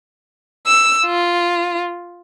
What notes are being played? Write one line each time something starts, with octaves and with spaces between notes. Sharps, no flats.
E6
F4